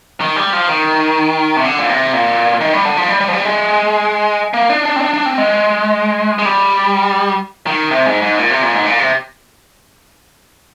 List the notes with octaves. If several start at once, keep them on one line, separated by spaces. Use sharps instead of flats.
D#3
G3
F3
D#3
C3
D3
A#2
C3
A#2
D#3
G3
D3
F3
G3
G3
F3
G3
G#3
A#3
D4
D4
C4
D4
D4
C4
G#3
G#3
G3
D#3
C3
G#2
G#2
A#2
C3
A#2
G#2
A#2
C3